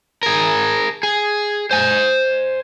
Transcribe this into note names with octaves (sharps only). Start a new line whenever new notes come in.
G#4 A#4
G#4
C5 G#5